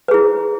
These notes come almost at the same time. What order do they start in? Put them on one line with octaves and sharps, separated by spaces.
B4 G#4 E4